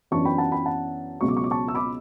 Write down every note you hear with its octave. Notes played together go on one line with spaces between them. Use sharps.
F#2 E3 B3 D4 A5 C#6
G5 B5
F#5 A5
G5 B5
F#5 A5
C#2 B2 F#3 C#6
D6
C#6
D6
A5 C#6
E6
B5 D6